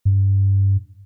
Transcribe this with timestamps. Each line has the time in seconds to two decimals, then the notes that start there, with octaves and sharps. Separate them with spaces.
0.05 G2